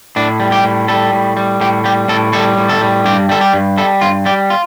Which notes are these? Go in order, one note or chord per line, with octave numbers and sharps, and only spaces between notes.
A2 D4
G3
G4
A2
G3 A4
A2
G3
A2 G4
G3 G4
A2 A4
G3 A4
A2
A4
G3
G2 G4
G3 A4
G4
G2
G3 A4
G2 F4
G3 G4
F4